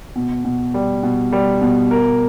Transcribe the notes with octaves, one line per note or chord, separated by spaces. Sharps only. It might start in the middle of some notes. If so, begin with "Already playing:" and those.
B2
B2
G3
B2
G3
B2
A#4